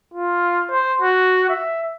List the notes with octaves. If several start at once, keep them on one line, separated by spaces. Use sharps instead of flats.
F4
C5
F#4
E5